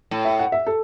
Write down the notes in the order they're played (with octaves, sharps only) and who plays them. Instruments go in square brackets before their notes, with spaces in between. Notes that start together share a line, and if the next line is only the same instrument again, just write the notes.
[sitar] A2
[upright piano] E5
F#5
E5
A4